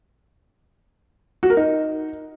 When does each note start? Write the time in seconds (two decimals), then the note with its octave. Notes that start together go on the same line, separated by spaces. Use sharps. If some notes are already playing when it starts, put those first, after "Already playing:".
1.43 F#4
1.50 A#4
1.57 D#4